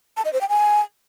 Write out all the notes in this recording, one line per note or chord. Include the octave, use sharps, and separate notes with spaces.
A5
D#5
C5
G5
G#5